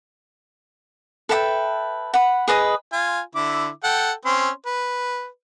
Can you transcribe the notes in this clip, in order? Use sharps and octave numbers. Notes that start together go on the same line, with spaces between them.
A4 B4 E5 G5
F#5 B5
G#4 B4 D#5 D#6
F4 G#5
D3 E4 D6
A4 F#5 G5
C4 C#4 C6
B4